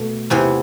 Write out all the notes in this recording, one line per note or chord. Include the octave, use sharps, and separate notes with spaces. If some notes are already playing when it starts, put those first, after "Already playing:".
Already playing: B2 A3
E2 C3 E3